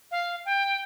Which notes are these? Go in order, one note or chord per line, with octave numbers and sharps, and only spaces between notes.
F5
G5